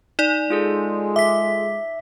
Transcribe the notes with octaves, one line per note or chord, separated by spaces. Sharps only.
D#4 D5
G#3 F4 G#4 A4
E5 D6 B6